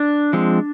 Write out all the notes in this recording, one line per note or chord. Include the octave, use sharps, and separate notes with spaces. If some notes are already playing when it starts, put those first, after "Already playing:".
Already playing: D4
F3 G#3 C4